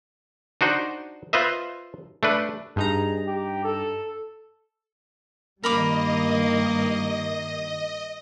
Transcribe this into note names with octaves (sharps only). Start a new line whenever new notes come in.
D4 D#4 F#4 C5
F4 B4 C5 D#5 E5
A3 D4 B4
G2 D#4 G#4 A#5
G4
A4
G2 D#3 G3 A#3 A#4 D#5 B5 D6